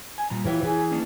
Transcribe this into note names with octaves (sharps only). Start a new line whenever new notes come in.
G#5
A#2 G3 A#5
A#2 E3 G4 A#4 C#5 E5
E3 G#4
A#3 C#4 D4